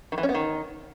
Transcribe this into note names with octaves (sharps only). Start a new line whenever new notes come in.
D#3
E3
C#4
B3
D#3